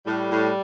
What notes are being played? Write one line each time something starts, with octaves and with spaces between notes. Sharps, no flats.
A2 G3
A2